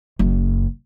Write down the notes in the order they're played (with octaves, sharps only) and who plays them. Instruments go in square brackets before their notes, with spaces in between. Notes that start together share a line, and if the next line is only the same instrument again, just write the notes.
[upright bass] F#1 F#2